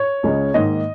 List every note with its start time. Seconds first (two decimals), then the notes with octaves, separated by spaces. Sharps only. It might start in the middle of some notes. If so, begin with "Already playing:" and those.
Already playing: C#5
0.23 C#2 C#3 G#3 C#4
0.54 G#2 D#3 A#3 D#4 D#5